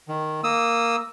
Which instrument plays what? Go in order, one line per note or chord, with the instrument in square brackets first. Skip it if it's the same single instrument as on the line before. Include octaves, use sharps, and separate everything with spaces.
[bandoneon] D#3
A#3 D#6 E6